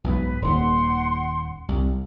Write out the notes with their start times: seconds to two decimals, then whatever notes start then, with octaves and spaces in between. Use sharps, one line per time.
0.04 B1 G#2 B4
0.42 D#1 D#2 F#5 C6
1.68 C2